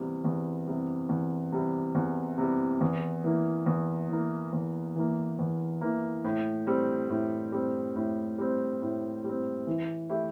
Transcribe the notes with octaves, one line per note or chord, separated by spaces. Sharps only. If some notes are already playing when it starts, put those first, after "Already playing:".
Already playing: E2 C3 G3
E2
C3 G3
E2
C3 G3
E2
C3 G3
E2
E3 A#3
E2
E3 A#3
E2
E3 A#3
E2
E3 A#3
A2
G3 C4
A2
G3 C4
A2
G3 C4
A2
G3 C4
E3
A3 E4 G4